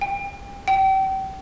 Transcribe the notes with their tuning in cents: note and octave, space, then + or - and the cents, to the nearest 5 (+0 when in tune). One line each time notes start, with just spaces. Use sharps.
G5 +35
G5 -30